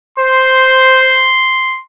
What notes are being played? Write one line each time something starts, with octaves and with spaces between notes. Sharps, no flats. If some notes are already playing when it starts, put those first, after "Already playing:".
C5 C6